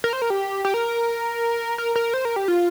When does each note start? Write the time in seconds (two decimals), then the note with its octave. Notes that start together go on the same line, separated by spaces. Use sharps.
0.04 A#4
0.13 C5
0.22 A#4
0.30 G4
0.65 G4
0.74 A#4
1.78 A#4
1.96 A#4
2.14 C5
2.25 A#4
2.36 G4
2.48 F4